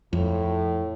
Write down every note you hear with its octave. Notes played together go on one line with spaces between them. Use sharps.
F2 A2